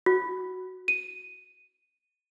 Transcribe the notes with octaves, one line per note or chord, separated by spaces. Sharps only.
F#4
D#7